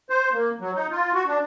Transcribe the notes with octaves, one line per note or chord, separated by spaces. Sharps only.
C5
A#3
F#3
D#4
F4
F#4
D4